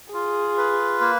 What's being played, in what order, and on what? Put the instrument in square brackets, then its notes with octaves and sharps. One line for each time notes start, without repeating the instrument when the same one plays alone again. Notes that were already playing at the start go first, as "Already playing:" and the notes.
[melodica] F4 [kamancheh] G#4
[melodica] B4
A#3